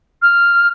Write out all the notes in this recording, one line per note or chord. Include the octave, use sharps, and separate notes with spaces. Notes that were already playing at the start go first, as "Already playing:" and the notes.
F6